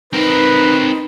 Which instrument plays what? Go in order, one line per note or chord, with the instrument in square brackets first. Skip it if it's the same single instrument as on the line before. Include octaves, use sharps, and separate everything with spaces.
[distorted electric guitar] C4 A#4 [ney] D#4 [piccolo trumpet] B4